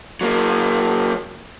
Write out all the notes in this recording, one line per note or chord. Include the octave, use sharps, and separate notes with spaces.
F#3 A#3